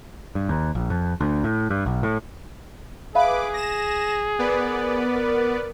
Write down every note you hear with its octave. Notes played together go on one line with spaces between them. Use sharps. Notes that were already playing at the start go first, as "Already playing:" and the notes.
G2
D#2
A#1
F2
D2
A2
G2
B1
A2
G#4 B4 E5 F5 B5 D6
A#6 E7
B3 A#4 B4 D5
A#4